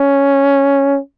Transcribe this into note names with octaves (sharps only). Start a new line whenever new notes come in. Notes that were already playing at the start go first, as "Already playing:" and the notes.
Already playing: C#4